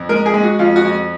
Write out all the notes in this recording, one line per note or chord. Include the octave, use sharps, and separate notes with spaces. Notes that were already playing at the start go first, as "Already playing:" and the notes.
Already playing: F2
G#3 A#4
G#4
G#3
F#4
F2 F4
F#4
F2